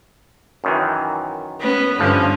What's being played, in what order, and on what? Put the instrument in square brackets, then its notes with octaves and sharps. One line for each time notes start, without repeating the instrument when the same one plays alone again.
[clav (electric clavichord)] F#2 D#3 E3
[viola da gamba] B3 C#4
[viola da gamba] G2 D3 C#4 [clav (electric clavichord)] E3 F3